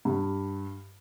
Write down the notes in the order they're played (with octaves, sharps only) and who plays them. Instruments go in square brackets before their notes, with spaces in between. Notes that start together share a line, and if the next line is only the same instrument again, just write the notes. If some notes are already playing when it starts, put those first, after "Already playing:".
[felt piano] G2